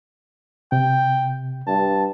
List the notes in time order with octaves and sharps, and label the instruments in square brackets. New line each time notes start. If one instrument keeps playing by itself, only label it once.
[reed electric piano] C3 [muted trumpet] G5
[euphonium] G2 [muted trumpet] A5